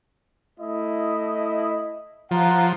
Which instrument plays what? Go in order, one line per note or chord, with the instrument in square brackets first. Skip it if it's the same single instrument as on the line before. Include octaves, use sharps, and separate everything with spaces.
[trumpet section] A3 E4 D#5
[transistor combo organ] F3 [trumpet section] F5 F#5 A#5